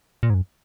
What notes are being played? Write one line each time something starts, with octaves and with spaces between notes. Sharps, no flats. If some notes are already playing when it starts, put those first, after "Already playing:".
A#2
G#2
F#2